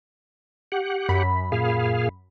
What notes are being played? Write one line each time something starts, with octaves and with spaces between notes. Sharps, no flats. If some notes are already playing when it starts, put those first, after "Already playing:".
G4 F#5
F#2 B5 B6
A#2 G#4 F5